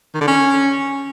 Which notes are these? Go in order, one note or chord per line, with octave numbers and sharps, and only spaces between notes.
D#3
D3
C#4